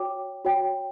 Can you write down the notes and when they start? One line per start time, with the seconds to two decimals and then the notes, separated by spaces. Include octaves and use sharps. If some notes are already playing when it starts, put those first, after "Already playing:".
Already playing: F#4 C#5 G5 D6
0.45 F#4 C#5 G5